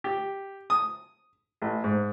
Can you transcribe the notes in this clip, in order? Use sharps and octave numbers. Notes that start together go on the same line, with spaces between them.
G4
D#6
A1
G#2